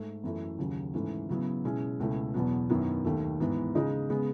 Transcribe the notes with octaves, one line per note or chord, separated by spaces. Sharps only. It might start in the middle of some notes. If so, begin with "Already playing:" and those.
Already playing: G#2 A3
F#2 E3 A3 E4
D#2 C#3 F#3
G#2 E3 A3 C#4
C#3 F#3 B3 E4
B2 G#3 C#4 E4
C#2 B2 A3 C#4 E4
E2 B2 F#3 B3
F#2 D#3 F#3 B3 E4
D#2 D#3 A3
G#2 E3 B3
C#3 G#3 D#4
C#3 G#3 B3